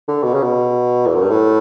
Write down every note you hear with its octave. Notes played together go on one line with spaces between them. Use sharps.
D3
B2
C#3
B2
E2
F#2
G2
A2